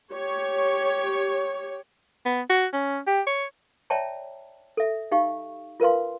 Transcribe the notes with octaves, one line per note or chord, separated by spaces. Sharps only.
G4 C#5
B3
F#4
C#4
G4
C#5
C#5 D5 E5 G5 A5 A#5
A4 E5
D#4 G4 F5 C#6
F4 A#4 B4 F5 C6